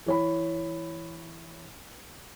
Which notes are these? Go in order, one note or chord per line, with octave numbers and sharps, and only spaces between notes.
E3 C#5 B5